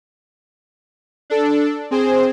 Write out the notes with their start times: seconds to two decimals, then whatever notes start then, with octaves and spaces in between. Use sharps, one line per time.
1.30 D4 A4
1.91 C4 G#4 C5